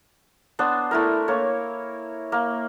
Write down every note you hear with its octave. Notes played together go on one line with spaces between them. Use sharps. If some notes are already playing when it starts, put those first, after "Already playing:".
B3 D4 C5
A3 E4 A#4
A#3 C#5
A#3